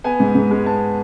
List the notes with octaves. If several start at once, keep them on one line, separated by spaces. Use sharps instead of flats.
B3 G#5
G#2
G#2
G#3
B3 A5